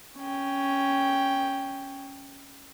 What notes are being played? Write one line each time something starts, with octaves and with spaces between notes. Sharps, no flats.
C#4 G5